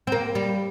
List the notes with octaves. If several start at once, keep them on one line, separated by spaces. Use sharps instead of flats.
C4
A#3
G3